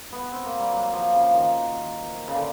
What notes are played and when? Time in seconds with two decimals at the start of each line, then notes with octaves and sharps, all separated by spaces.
0.12 B3
0.32 C4
0.45 A#3
0.59 G3
0.73 F#3
0.93 F3
1.13 C#3
1.33 D#3
2.28 C#3
2.34 D3